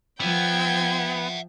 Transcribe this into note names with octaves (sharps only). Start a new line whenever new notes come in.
F3 B3 E5 F#5 G5 G#6